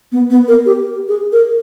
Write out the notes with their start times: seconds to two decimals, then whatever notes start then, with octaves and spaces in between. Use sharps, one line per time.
0.12 B3
0.30 B3
0.48 A#4
0.66 G4
1.08 G#4
1.32 A#4